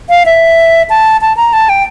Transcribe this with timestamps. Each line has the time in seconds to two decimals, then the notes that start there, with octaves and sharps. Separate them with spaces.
0.09 F5
0.26 E5
0.90 A5
1.21 A5
1.37 A#5
1.53 A5
1.69 G5